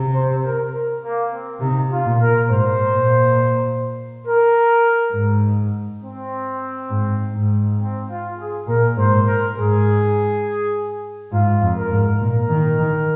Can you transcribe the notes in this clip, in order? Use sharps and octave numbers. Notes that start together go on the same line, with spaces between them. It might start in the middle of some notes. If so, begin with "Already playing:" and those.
Already playing: C3
C5
A#4
A#4
A#3
C4
C3 D#4
F4
A#2
A#4
G#2 C5
A#2
A#4
G#2
C4
G#2
G#2
C4
F4
G#4
A#2 A#4
G#2 C5
A#4
G#2 G#4
G#2 F4
F2
A#4
G#2
A#2 A#4
D#3
D#3